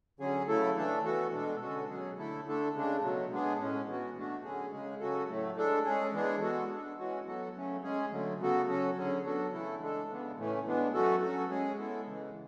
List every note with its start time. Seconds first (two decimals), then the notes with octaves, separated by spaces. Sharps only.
0.20 D3 F#3 C#4 G#4
0.48 C#3 F#3 A3 E4 A4
0.77 E3 A3 D4 A4
1.04 E3 B3 F#4 A4
1.33 B2 G#3 D4 A4
1.61 D3 G#3 C#4 F#4 A4
1.89 B2 F#3 C#4 G#4
2.17 D3 A3 E4 A4
2.46 D3 A3 D4 A4
2.75 C#3 G#3 D4
3.03 B2 F#3 A3
3.31 G#3 B3 D4 G#4
3.59 A2 G#3 C#4
3.87 E3 B3 F#4
4.16 B2 A3 D4 F#4
4.44 D3 F#3 C#4 G#4
4.72 C#3 G#3 C#4 G#4
5.00 C#3 F#3 C#4 F#4 A4
5.28 A2 F#3 A3
5.56 G#3 D4 A4
5.85 G#3 C#4 G#4
6.13 E3 G#3 B3 D4 G#4
6.42 G#3 B3 F#4 A4
6.69 G#3 D4 A4
6.98 E3 G#3 C#4 F#4
7.27 F#3 B3 F#4 A4
7.55 C#3 F#3 A3 C#4
7.83 G#3 C#4 G#4
8.11 D3 F#3 A3
8.39 C#3 F#3 B3 F#4 A4
8.68 F#3 C#4 F#4 A4
8.96 D3 F#3 C#4 G#4
9.23 F#3 B3 D4 F#4 A4
9.52 C#3 E3 A3 E4 A4
9.80 G#3 D4 A4
10.09 C#3 E3 G#3 B3 D4
10.37 A2 E3 A3 C#4
10.66 E3 G#3 B3 D4
10.93 F#3 A3 C#4 F#4 A4
11.21 F#3 C#4 F#4 A4
11.50 G#3 C#4 G#4
11.78 G#3 B3 E4 A4
12.07 C#3 E3 G#3